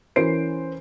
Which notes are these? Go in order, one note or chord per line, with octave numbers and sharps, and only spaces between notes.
E3 C#4 A#4 C5 C7 D7